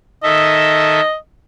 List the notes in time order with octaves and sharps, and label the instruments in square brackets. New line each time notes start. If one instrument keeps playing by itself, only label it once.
[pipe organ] D#3 A4 E5 [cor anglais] D#5